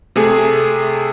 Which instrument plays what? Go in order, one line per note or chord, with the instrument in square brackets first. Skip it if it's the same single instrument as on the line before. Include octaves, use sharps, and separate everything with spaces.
[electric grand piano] C3 A3 G#4